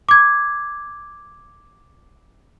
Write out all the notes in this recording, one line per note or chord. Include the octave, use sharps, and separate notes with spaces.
D6 G#6